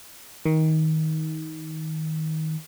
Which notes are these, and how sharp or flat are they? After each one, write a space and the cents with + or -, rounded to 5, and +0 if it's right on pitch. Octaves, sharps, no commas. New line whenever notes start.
D#3 +20